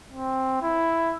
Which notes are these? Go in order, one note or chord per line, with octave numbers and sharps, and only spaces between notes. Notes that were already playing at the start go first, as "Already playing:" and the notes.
C4
E4